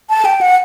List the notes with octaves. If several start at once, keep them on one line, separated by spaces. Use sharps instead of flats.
A5
G5
F#5